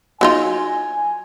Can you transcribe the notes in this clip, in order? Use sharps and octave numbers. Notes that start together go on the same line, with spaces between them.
F#3 D#4 F4 G#5